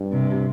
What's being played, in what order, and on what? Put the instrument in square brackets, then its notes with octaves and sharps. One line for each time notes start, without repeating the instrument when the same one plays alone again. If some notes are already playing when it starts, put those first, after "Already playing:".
Already playing: [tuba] G2
[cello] C3